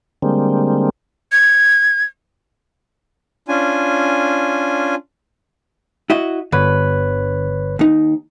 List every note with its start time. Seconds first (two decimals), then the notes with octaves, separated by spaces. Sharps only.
0.22 D3 G3 G#3 A#3 C4
1.32 G#6
3.48 C#4 D4 F4 G#5
6.10 E4 F#4 D#5
6.52 G1 D3 B4 C#5
7.79 D#2 D#4